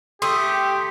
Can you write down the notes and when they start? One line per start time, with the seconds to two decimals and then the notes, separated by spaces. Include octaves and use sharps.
0.22 A3 G4 C6 D#6 E6